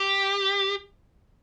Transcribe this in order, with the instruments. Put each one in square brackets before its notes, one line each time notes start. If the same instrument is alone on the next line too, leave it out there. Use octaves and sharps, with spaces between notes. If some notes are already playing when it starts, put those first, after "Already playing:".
Already playing: [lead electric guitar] G4